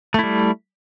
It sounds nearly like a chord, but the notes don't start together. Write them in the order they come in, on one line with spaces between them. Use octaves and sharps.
A3 E4 G3